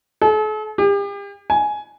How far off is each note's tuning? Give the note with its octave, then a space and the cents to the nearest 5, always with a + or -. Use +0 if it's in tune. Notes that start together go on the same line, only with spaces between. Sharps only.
A4 -45
G4 +40
G#5 +10